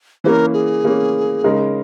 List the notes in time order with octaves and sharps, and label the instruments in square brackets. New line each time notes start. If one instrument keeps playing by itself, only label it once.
[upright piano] E3 A#3 C#4 [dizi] A#4 C5
[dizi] G#4
[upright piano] E3 A#3 C#4
C#3 G#3 D#4 A#4